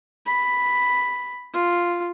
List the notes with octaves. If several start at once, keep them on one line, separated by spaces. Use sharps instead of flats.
B5
F4